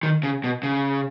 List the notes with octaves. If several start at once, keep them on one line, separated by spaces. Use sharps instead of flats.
D#3
C#3
B2
C#3